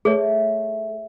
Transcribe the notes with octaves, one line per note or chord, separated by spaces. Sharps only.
A3 G#4 C#5